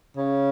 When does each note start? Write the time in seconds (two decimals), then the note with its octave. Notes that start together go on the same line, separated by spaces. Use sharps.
0.17 C#3